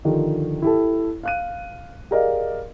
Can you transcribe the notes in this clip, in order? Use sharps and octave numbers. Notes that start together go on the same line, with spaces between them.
D3 D#3 F3 G4
E4 G4 A4
F5 F#6 D#7
G4 G#4 A#4 D5 D#5 F5